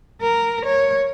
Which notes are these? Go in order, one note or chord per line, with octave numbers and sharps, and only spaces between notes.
A#4
C#5